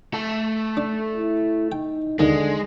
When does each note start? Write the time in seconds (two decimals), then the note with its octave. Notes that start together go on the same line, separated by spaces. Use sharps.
0.14 A3 A4
0.77 D4
1.17 E4
1.72 D#4 G5
2.19 D#2 D3 D#3 G#3